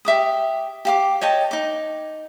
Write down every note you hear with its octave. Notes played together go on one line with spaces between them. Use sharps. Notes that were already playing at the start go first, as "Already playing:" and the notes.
G4 E5 D6 D#6
G4 F5 D6
C#5 D#5 G5 A5
D#4 D6